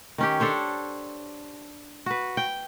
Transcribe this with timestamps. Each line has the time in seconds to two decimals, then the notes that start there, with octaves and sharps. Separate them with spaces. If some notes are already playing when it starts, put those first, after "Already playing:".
0.18 D#3 C#4 G4
0.40 D4 A4 C5 C#5
2.06 F#4 B4
2.37 G5